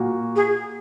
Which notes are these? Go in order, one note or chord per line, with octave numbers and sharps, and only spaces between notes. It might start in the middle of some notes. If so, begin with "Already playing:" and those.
Already playing: A#2 A#3 F#4
G#4